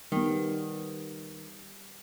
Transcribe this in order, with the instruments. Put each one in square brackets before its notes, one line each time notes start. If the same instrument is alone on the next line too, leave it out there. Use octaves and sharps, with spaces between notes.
[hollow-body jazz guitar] D#3 [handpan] G3 B3